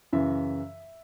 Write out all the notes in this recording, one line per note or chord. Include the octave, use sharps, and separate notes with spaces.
F#2 C#3 E3 E5